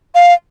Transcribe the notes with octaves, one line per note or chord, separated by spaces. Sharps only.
F5